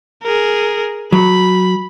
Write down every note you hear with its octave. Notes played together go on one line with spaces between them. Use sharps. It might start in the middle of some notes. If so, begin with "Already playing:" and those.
G#4 A#4
F#3 B5